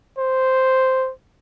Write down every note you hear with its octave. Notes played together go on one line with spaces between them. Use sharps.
C5